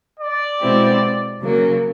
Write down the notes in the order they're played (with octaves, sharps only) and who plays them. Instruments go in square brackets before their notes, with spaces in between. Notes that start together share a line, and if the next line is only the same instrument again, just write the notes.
[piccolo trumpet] D5
[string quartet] B2 G#3 C4 E4 G4
C#3 F#3 A#3